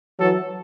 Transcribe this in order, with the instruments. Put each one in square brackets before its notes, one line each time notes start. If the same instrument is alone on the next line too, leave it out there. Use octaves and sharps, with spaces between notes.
[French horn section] E3 F#3 [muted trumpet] A4